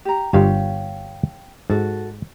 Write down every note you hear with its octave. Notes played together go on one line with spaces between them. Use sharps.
G4 A#5
G1 G2 F4 G4 C#5 F5
G#2 F#4 A4